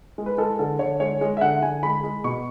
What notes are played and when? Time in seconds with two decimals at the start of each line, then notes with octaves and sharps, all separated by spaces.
0.18 G#3
0.26 B4
0.38 G#3 A4
0.59 D3 A4
0.79 D3 C#5
1.00 G#3 C#5
1.21 G#3
1.37 E5
1.41 D3 F#5
1.62 D3 G#5
1.83 G#3 B5
2.04 G#3
2.24 B2 C#6